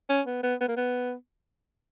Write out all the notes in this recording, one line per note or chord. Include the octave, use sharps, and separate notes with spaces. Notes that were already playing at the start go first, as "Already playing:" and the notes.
C#4
B3
B3
B3
A#3
B3